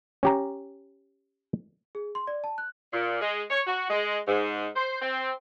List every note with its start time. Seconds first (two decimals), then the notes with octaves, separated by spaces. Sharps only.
0.23 C#4 G4 A#5
1.95 G#4
2.15 C6
2.27 D5
2.44 A5
2.58 F#6
2.93 A#2
3.21 G#3
3.50 C#5
3.67 F#4
3.90 G#3
4.28 G#2
4.76 C5
5.02 C4